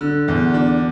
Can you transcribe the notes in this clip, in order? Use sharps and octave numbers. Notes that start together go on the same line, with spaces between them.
D3
E2
D4